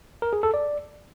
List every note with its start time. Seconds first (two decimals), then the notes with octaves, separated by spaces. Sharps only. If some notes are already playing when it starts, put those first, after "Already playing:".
0.22 A#4
0.33 G#4
0.43 A4
0.54 D5